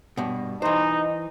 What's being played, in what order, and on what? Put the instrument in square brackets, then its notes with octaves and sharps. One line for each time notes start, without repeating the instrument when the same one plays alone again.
[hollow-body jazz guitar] G2 B2
[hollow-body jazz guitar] E3 C5 [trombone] D#4